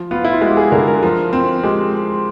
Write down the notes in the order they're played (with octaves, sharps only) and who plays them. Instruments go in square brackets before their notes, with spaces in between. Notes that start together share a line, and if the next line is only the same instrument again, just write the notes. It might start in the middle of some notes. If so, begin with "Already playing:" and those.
Already playing: [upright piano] F3
[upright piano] B3 [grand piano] F4
[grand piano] E4
F4
[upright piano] G#3 [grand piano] F#4
[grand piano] G4
G#4
[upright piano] D3 [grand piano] A#4
[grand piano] A#4
[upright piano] F3 [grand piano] A#4
[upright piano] C4
[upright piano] G#3 [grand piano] G4